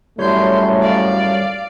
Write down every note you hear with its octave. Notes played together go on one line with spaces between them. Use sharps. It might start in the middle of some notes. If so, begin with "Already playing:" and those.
G#1 F#2 A2 G3 A3 C#5 C6 G6
D5 F5